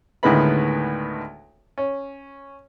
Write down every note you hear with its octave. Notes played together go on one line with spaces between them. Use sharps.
D2 A2 D#3 G#3 B3 B5
C#4